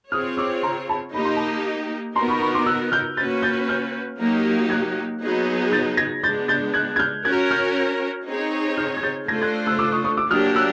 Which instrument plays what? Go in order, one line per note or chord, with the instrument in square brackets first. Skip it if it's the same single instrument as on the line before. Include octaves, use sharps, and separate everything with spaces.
[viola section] C4 F4 G#4 C#5 [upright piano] D#6 F6
[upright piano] D6 E6
A#5 C6
A5 B5
[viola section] A#3 D#4 G4 [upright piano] B5
[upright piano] C6
A5 B5
[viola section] B3 D#4 F#4 A#4 [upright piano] A#5 C6
[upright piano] B5 C#6
B5 C#6
C6 D6
E6 F#6
F6 G6
[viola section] A#3 C#4 F#4 B4 [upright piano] G6 A6
[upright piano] G6 A6
F6 G6
[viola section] F#3 A#3 D#4 G4
[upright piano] F#6 G#6
[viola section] F#3 B3 D#4 G#4
[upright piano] G6 A6
G#6 A#6
[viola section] G#3 B3 D4 [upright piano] G6 A6
[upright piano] G6 A6
F#6 G#6
G#6
F6 G6
[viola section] C#4 F#4 A#4 C#5 [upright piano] F#6 G#6
[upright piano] F6 G6
[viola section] C4 D#4 G#4 C#5
[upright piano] F6 G6
G#6
G6 A6
[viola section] A3 D4 F4 A4 C5 [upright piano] G#6 A#6
[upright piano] F#6 G#6
E6 F#6
D6 E6
C#6 D#6
C#6 D#6
D6 E6
[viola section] F#3 A#3 D4 G4 [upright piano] D#6 F6
[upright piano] E6 F#6